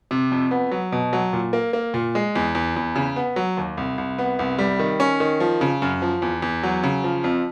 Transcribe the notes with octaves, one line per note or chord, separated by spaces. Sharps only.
C3
F2
B3
F#3
B2
F#3
A#2
A#3
A#3
A#2
G#3
E2
E2
E2
C#3
B3
F#3
D#2
C2
C2
B3
C2
G3
D#3
C#4
D#3
F3
C#3
F#2
F3
E2
E2
F#3
C#3
F3
F2